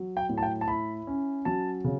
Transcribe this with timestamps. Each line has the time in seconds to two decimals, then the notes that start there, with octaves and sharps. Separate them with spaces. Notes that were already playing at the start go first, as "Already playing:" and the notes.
Already playing: F#3
0.17 G5
0.29 A2
0.38 A5
0.43 G5
0.61 A5
0.68 E4 B5
1.07 C#4
1.45 F#3 A5
1.84 C#3